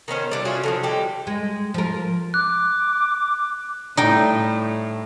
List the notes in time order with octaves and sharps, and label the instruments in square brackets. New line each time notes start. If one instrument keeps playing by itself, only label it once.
[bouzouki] D#3 B3 C#4 C5
G3 D4 E4
C#4 F4 F#4 G#4
D3 E3 F3
G3 G#3 G4
[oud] G#3
F3 A#4
[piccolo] D6 [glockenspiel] F#6
[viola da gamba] A2 [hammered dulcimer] G3 E4 [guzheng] D#4 G5